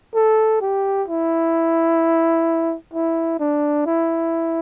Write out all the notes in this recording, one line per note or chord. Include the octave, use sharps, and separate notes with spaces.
A4
G4
E4
E4
D4
E4